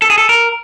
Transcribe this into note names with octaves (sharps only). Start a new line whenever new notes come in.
A4
G#4
A4
A#4